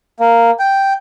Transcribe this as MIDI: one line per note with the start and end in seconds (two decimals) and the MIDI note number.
0.20 0.51 58
0.59 0.93 79